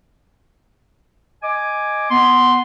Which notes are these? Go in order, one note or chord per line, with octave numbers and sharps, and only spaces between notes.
D#5 G#5 D6
B3 C6